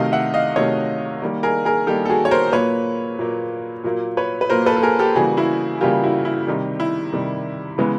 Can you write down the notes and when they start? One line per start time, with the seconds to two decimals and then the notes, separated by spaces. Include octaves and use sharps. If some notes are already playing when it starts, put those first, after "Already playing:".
Already playing: C3 D#3 F#3 A3 D#5 F5
0.12 E5 F#5
0.34 D#5 F5
0.56 C3 D#3 F#3 A3 C#5 D#5
1.22 D#3 G3 A#3
1.43 G#4 A#4
1.65 G#4 A#4
1.87 D#3 G3 A#3 G4 A4
2.06 A4
2.10 F#4 G#4
2.25 C#5
2.31 A#4 C5
2.53 A#2 F#3 A#3 B4 C#5
3.19 A#2 F#3 A#3
3.84 A#2 F#3 A#3
4.17 B4 C#5
4.41 B4
4.50 A#2 F#3 A#3 A#4 C5
4.66 A4 B4
4.77 A4
4.83 G#4 A#4
4.99 G4 A4
5.15 C#3 E3 G3 A#3 F#4 G#4
5.37 E4 F#4
5.81 C#3 E3 G3 A#3 F4 G4
6.03 E4 F#4
6.25 E4
6.47 C3 D#3 G3
6.80 E4
7.13 C3 D#3 G3
7.78 C#3 E3 G#3 B3